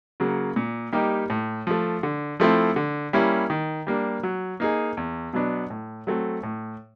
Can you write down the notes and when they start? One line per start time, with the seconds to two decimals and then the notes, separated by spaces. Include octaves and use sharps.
0.20 C#3 F#3 A#3
0.56 A#2
0.92 G3 A#3 D#4 G4
1.30 A2
1.67 F3 A3
2.03 D3
2.40 F3 A3 C4 E4
2.76 D3
3.13 G3 A#3 C#4 E4
3.50 D#3
3.87 G3 A#3 D4
4.23 F#3
4.60 A#3 D#4 G#4
4.97 E2
5.33 B2 F#3 B3 D4
5.70 A2
6.07 F#3 A3 C4
6.43 A2